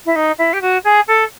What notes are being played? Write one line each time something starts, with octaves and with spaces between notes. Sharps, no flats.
E4
D#4
E4
G4
F#4
G#4
A4